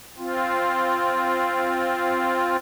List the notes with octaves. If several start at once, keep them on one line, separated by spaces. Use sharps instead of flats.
C4 F4